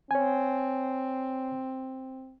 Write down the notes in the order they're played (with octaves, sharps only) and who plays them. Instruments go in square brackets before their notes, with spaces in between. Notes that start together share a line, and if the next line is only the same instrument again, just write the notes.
[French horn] C4 [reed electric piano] C#5 G#5